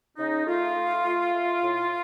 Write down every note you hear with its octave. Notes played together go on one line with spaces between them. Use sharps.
C#3 D#4
A3 F4
A3
A3
A3
A2